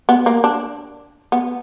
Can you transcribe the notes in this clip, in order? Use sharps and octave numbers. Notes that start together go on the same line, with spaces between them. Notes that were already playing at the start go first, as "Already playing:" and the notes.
B3
A#3
D4
B3